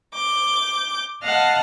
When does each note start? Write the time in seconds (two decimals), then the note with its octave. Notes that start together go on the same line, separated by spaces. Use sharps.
0.13 D6 G6
1.22 D#5 F5 F#5 A5 F6